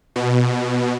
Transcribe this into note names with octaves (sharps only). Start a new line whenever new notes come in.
B2